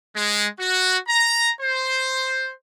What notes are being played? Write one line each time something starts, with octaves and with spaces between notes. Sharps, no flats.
G#3
F#4
A#5
C5